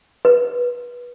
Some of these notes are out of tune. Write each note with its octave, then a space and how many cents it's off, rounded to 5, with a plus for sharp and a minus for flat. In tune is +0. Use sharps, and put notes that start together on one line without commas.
B4 -25